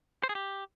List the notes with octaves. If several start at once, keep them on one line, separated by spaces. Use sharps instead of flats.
C5
G#4
G4